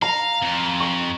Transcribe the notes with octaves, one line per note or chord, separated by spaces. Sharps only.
F5 A#5
F2
C#6 C7